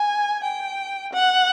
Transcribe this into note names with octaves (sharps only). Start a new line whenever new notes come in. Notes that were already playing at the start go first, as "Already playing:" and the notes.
Already playing: G#5
G5
F#5